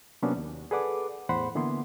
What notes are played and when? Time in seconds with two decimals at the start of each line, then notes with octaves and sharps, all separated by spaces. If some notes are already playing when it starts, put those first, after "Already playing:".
0.22 C3 F#3 A#3 B3 C#4 D4
0.36 D#2
0.71 G#4 A4 B4 D5 F#5 D6
1.29 E2 A2 C5 F#5 B5 C6
1.55 D3 E3 A#3 B3 E4 C6